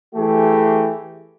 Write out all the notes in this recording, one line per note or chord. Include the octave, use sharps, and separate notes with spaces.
E3 A3 G4 G#4